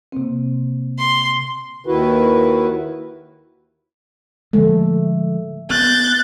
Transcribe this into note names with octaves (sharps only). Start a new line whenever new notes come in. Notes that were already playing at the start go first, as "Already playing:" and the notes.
C3 A#3 C4
C6
D#2 D#3 E4 F#4 B4
D3 F3 G#3 A3
B3 F#6 G6 A6